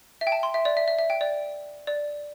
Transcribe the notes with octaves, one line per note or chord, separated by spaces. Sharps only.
E5
G5
A5
C6
E5
D5
E5
E5
E5
G5
D5
D5